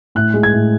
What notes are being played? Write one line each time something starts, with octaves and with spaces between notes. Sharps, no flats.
A2 F#6
G#3
G#6
A2